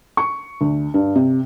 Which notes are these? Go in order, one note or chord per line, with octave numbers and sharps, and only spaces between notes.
C#6
D2
G2
C3